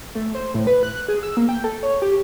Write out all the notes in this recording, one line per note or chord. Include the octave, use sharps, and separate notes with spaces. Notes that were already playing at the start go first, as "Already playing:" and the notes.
A3
C5
A2
B4
F#6
G#4
E6
A#3
G5
A4
C#5
G4